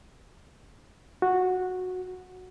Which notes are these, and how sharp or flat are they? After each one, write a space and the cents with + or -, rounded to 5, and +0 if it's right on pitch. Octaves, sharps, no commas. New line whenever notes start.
F#4 -10